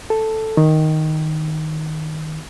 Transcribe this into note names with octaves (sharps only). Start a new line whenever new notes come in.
A4
D#3